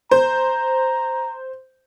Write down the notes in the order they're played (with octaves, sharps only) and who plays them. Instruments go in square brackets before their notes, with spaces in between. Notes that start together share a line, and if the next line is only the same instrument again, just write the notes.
[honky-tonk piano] C5 [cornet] A#5